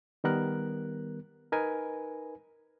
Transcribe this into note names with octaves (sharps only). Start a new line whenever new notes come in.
D#3 G3 B3 A#4 F#6
D#4 A#4 B4 G#5